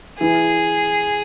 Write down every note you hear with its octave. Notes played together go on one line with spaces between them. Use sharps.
E3 G#4